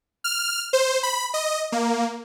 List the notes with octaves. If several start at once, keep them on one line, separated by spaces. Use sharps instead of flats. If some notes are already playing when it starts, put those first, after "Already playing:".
F6
C5
B5
D#5
A#3